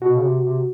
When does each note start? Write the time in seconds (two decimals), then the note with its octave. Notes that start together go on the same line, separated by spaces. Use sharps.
0.02 B2 F#4
0.16 C#3
0.23 C3
0.44 C3